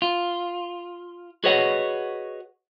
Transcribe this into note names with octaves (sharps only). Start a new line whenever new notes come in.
F4
F#4 G#4 B4 C#5 D#5 F#5